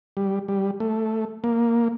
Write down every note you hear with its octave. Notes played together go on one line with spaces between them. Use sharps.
G3
G3
A3
A#3